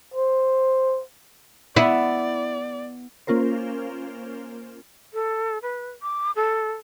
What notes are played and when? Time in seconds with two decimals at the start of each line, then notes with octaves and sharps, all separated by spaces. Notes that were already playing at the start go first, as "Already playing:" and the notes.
0.14 C5
1.76 B3 E4 D5
3.27 A#3 C#4 F4 A#4 C5
5.14 A4
5.62 B4
6.02 D6
6.36 A4